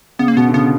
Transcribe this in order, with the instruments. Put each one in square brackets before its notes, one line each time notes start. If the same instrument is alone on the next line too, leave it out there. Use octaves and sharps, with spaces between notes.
[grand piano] C#3 [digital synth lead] B3
[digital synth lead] A#3
[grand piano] B2 [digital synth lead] B3
[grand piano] D3
[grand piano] C#3 [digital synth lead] B3